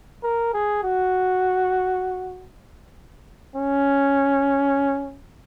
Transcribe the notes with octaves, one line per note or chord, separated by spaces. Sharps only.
A#4
G#4
F#4
C#4